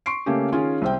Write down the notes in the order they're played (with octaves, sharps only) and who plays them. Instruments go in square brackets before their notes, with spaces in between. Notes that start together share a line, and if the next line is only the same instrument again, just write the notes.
[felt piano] C6 C#6 C7 D7
C#3 A3 A#3 C#4 G4
D#3 C#4 F4 G#4
C2 C4 G5